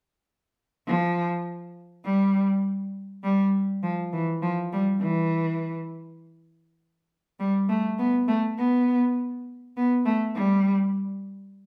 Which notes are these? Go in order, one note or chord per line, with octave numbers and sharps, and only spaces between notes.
F3
G3
G3
F3
E3
F3
G3
E3
G3
A3
B3
A3
B3
B3
A3
G3